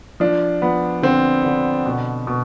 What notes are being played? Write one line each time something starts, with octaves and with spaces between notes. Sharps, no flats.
F3 D4
F3 B3
D3 C4
D3
B2
B2